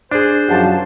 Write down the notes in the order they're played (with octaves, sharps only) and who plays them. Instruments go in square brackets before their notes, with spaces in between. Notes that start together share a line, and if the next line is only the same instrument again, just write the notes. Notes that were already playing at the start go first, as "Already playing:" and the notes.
[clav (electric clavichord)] D4 G#4 [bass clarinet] C5
[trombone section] F#2 F3 [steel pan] G4 F#5 A5